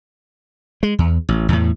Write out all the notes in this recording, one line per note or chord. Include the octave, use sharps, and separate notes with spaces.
G#3
E2
A1
E2 A2